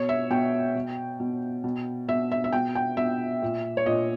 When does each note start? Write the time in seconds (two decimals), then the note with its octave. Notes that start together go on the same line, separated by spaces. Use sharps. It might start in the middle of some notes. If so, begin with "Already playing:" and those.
Already playing: B2 C#5
0.09 E5
0.30 B2 G5
0.75 B2
1.20 B2
1.64 B2
2.08 B2 E5
2.31 E5
2.44 E5
2.52 B2 G5
2.75 G5
2.97 B2 E5
3.42 A#2
3.77 C#5
3.86 A#2 D#5